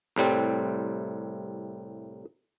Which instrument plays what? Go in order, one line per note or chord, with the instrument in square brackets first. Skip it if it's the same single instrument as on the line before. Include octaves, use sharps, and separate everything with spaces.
[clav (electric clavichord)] C2 A2 G3 C4